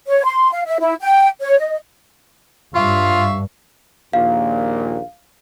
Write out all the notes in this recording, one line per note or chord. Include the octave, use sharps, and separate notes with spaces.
C#5
C6
F5
E5
E4
G5
C#5
D#5
G2 F4 C#5 E5 F5
A#1 D#2 A#2 F5